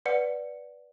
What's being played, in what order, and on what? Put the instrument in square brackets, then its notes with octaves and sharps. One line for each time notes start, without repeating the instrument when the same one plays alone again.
[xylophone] B4 D5 F#5 C#7